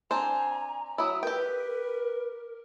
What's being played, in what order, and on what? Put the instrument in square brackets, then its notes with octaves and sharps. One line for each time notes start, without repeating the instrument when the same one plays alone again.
[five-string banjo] C4 D4 C5 [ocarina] G#5 [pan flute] A#5
[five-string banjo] F#3 E4 [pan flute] D#6 [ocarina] E6
[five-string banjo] G4 G5 [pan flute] A#4 [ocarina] B4